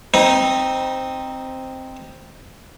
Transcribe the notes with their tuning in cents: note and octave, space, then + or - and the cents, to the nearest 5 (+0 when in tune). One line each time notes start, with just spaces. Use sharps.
C4 +0 D#4 -5 B5 -45